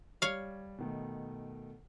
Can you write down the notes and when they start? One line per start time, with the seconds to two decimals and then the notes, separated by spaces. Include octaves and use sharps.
0.22 G3 C#5 F5
0.78 B2 D#3 A3